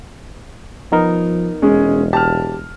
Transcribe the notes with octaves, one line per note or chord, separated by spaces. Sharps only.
F3 B3 D#4 A#4
E1 G#3 C#4 G#4
G4 A5 F6